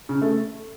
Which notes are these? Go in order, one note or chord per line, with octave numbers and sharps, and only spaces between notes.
C#3
A3